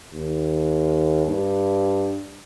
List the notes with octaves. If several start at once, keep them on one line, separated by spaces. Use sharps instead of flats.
D#2
G2